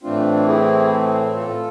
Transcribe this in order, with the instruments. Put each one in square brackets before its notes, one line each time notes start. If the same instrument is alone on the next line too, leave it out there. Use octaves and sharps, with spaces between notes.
[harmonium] A2 E3 A3 C4 D4 F4
E4 G#4
F4 A4